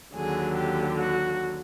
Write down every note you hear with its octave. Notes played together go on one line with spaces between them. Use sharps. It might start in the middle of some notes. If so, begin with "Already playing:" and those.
D#2 D3 F#3 G#4
G4
F#4